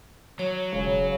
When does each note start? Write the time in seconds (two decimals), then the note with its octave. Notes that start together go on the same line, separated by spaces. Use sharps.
0.39 F#3 C#5
0.73 E1 C#3